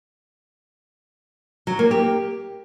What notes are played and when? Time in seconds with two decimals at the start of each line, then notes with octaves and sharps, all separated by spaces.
1.67 F#3
1.79 A#3
1.91 G4